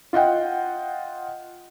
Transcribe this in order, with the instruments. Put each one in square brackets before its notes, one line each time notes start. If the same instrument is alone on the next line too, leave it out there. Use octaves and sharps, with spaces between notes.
[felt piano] F4 D#5 F#5 G5